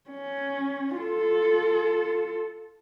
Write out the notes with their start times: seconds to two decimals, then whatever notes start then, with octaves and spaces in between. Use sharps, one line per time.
0.10 C#4
0.96 F4 A4